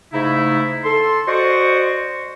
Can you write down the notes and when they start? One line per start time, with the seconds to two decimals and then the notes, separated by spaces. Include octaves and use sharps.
0.13 G#2 C#3 A3 D#4 E4
0.84 A4 C6
1.28 F#4 C5 D5 D#5 C6 C#6